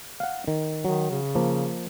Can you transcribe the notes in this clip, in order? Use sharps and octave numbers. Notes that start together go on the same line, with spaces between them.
F5 F#5
D#3
D#3 F#3
C#3
F3 A#3